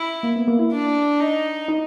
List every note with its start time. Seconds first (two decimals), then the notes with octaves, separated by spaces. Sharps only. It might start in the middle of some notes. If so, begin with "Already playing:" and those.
Already playing: E4
0.23 A#3
0.36 B3
0.47 A#3
0.59 E4
0.72 D4
1.20 D#4
1.68 D#4